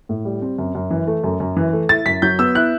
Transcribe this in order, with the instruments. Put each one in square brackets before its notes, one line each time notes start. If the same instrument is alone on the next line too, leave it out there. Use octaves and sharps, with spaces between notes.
[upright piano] A2
G3
C4
F#2
F#2
E3
A3
F#2
F#2
E3
A3
E4 A6
F#2 B6
F#3 G6
B3 E6
E4 F#6